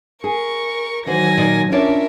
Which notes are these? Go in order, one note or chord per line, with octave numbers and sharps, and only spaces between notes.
G#4 A#4 C#6
D#3 E3 F#3 F#4 C5 G#5 A#6
A#2 D#4 D5
C#4 D4 F4 A#4 C#5 D5 E5